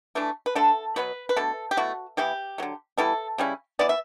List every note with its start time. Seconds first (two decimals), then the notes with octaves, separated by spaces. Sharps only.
0.15 E3 A3 D4
0.46 B4
0.55 D3 A3 D4 A4
0.96 B2 F#3 B3 B4
1.29 B4
1.36 B2 A3 D4 A4
1.71 G4
1.77 B2 A3 E4 F#4
2.17 E3 B3 E4 G4
2.58 D3 F#3 A3
2.98 E3 G3 B3 E4 A4
3.38 C#3 G3 C#4 E4
3.79 E3 B3 E4 D5
3.89 E5